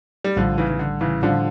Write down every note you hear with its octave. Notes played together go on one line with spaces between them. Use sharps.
G3
A#1 A2 D3 F3 G3
C#3 E3
E3
D3
C#3 E3
A2 D3 F3 G3 D4 F4